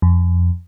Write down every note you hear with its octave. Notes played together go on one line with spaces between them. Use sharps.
F2